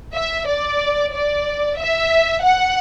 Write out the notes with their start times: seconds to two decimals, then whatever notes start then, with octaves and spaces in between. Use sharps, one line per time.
0.14 E5
0.46 D5
1.13 D5
1.78 E5
2.43 F#5